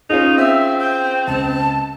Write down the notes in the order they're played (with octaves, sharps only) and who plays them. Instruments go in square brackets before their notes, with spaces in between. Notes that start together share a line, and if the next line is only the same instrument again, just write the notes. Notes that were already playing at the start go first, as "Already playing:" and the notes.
[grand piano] C#4 F4 G#4 [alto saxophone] D#4
[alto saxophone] C4 [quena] E5
[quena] G5
[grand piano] C#2 [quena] A5